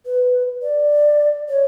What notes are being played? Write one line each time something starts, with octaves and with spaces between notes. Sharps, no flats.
B4
D5
C#5